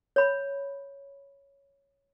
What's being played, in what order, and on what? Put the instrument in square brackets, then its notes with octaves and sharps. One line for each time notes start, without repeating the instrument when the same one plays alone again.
[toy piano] C#5 B5